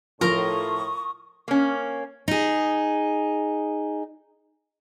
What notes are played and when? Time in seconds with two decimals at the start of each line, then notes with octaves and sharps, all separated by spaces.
0.21 A2 F3 F4 A#4 A#5 C#6 D#6
1.48 A#3 C#4
2.28 D#4 G#4